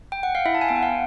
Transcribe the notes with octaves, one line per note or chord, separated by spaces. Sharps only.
G5
F#5
F5
E4 E5
A5
G#5
B3 G5
F#5
F5